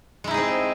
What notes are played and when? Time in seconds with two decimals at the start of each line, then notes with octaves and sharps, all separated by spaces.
0.24 G#3
0.27 E4
0.31 D#4
0.34 G#4
0.37 C4